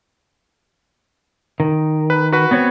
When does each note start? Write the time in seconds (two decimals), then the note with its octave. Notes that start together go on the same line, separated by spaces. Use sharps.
1.60 D#3
2.10 B4
2.32 F#4 B4
2.51 B3 C4 C#5